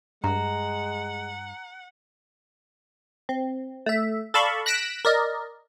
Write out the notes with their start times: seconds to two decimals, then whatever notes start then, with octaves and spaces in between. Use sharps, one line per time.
0.24 G2 G#3 F#5 A#5
3.29 C4
3.86 A3 E5
4.34 A4 D5 F5 A5 B5 C#6
4.66 F#6 A#6 B6 D7 E7
5.05 A#4 D5 D#5